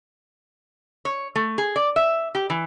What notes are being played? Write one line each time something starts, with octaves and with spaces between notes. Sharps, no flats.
C#5
A3
G#4
D5
E5
G4
E3